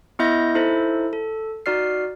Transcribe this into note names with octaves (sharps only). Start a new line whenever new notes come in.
B3 E4 D#5 E5 G6 A#6
D#4 E4 A4 C5 E5
A4
D#4 F#4 D5 F6 C7